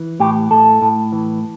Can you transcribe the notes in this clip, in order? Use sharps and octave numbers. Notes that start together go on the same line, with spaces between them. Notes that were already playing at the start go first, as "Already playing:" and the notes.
Already playing: E3
A2 G4
A2 A4
A2
E3